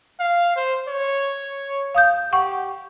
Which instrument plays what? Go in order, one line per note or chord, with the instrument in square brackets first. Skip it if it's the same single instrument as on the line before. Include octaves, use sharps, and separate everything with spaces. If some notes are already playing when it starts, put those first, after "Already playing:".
[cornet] F5
C5
C#5
[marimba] F5 D#6 G6
[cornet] G4 [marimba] F#5 C#6